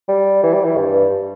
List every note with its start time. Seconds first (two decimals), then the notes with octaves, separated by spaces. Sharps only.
0.08 G3
0.43 E3
0.54 G3
0.64 E3
0.77 G2